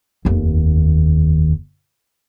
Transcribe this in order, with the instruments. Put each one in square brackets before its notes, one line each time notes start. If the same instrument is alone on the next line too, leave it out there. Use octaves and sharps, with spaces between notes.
[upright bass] F1 D#2